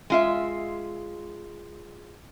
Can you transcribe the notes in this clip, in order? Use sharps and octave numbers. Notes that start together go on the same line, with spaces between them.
G#3 F4 E5